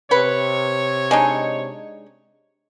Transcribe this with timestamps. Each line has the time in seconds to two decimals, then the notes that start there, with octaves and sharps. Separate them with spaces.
0.11 C3 B4 C#5
1.11 G#3 D4 D#4